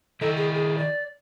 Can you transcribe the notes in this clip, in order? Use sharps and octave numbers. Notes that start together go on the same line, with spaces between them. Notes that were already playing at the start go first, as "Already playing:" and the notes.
D#3 E4 A4 D#5
G#4
G#4
D5